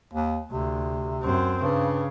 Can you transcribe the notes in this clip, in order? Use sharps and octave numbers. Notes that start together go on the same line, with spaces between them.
D#2
D2 C3
F#2 C4
G2 C#3